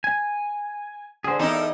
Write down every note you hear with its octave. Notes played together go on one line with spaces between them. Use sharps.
G#5
D3 G#4 C5
E2 D#4 E4 A4 A#4